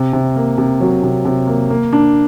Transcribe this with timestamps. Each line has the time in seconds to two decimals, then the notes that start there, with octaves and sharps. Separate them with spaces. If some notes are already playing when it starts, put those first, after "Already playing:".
Already playing: C3
0.13 C3
0.36 A#3
0.58 C3
0.81 F#3
1.03 C3
1.25 C3
1.47 A#3
1.70 A#3
1.93 D4